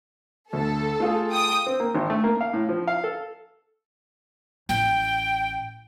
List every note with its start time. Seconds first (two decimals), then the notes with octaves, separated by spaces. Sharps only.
0.53 D2 A4
1.00 A3 F4 G#4
1.31 G5 D#6
1.66 C4
1.80 A#3
1.95 G#1
2.10 A3
2.24 A#3
2.41 F5
2.53 A2
2.69 F3
2.87 F5
3.04 A4
4.69 A1 G5